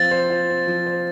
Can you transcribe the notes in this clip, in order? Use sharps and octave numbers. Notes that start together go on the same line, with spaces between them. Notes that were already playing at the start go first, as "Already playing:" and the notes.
Already playing: F3 C4 F4 A6
C5
F4
C4
F3
C5